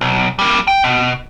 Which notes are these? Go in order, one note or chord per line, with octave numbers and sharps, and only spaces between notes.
B1
G3 A#3
G5
B2